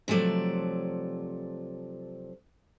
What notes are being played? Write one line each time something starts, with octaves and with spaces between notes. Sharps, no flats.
C3 F3 F#3 A3 D5